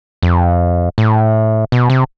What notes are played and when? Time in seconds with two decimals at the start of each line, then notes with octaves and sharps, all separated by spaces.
0.23 F2
0.98 A2
1.72 B2
1.90 C3